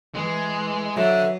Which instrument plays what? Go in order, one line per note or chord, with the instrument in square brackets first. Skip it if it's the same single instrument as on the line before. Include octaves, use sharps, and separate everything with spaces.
[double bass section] E3 [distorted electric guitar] G#3
[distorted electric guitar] D3 [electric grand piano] F#3 [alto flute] E5